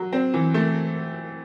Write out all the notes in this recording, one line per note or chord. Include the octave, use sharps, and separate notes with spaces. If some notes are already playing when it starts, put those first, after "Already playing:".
Already playing: F#3
C4
E3
A3